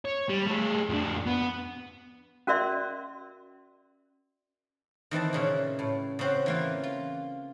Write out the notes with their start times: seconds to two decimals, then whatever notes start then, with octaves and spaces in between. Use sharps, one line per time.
0.05 C#5
0.30 G3
0.48 A3 G#4
0.89 F2 D4
1.26 B3
2.47 C#4 F#4 A#4 D5 E5 C6
5.11 D#3 E3 C4 A5
5.33 A#2 C#3 E3
5.79 A2
6.19 C#3 C4 F#4
6.46 E3 A#3 F4
6.84 F4